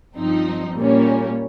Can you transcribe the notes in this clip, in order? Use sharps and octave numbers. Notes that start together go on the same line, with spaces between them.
G2 F3 C4 D#4
A#2 G3 A#3 C#4